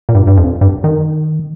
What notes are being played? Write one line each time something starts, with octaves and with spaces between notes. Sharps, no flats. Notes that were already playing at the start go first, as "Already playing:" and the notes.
A#2
G2
G2
F2
G2
D#3